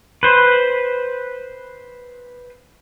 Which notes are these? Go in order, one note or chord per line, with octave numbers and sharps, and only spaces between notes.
B4 C5